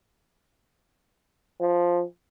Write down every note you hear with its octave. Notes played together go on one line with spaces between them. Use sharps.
F3